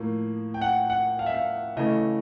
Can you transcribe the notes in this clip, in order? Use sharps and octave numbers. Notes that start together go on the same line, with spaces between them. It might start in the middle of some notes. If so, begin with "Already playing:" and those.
Already playing: A2 F3 A#3
G5
F#5
F#5
F5
E5
F5
C#3 E3 A3 D#5